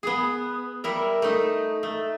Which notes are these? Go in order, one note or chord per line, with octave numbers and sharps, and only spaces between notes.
B3 G#4
G3 E4 A#4
A3 D#4
A3